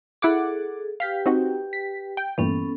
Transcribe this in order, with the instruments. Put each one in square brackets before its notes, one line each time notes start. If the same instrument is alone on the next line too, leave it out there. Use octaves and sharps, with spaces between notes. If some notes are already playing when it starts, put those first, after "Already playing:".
[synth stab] E4 F#5 D6 [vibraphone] G#4 A4
[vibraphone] G4 B4 G5 [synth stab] F5 B6
[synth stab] C4 D#4 F#4
B6
G5
[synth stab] G2 A#2 E3 [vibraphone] B3 C#4 A4